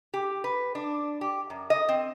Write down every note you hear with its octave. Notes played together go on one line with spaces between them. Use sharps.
G4
B4
D4
G4
F#2
D#5
C4